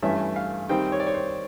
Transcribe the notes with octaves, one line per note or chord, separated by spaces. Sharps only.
G2 E3 A3 C#4 E5
F5
D#3 G3 C4 G5
C#5
D5
C#5
C5